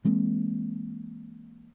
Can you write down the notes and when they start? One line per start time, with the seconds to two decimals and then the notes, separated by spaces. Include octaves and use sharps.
0.05 E3 G#3 A#3 C4